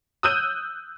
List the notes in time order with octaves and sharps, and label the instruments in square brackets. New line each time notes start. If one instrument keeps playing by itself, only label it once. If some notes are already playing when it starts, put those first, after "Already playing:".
[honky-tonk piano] D#6 E6 F#6 G6 D#7